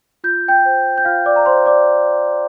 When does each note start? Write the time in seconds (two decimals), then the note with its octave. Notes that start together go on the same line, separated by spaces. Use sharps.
0.24 F4 G6
0.48 G5 G6
0.65 C5
0.98 G6
1.05 F4 F5 F6
1.26 D5 D6
1.36 A#5
1.46 C5 C6
1.66 D5 D6